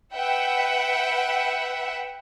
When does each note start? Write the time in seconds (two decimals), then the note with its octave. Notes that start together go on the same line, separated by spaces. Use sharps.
0.13 B4 E5 F#5 G5